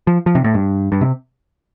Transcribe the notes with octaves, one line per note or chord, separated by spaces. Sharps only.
F3
F3
C3
A2
G2
G2
C3